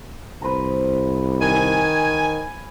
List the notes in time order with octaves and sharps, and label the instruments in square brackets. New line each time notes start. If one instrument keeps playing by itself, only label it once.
[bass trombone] C2 [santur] B4 C5 A#5
[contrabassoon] D#3 [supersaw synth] G#5